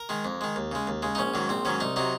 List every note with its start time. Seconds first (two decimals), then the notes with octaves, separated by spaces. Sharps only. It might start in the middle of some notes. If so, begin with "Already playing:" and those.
Already playing: A#4
0.09 D#3 G#3
0.25 F2
0.41 D#3 G#3
0.56 D#2
0.72 C#3 G#3
0.87 D#2
1.02 C#3 G#3
1.15 D#4
1.19 A#1 C#4
1.34 G#2 D#3 F#3
1.49 A#1 C4
1.65 G#2 D#3 F#3 C#4
1.80 C2 D#4
1.96 C3 F#3 D#4